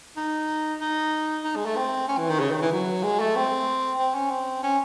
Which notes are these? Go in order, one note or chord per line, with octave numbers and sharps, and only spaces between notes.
D#4
D#4
D#4
G#3
A3
C4
C#4
E3
D#3
C#3
D#3
E3
F#3
G#3
A3
C4
C4
C#4
C4
C#4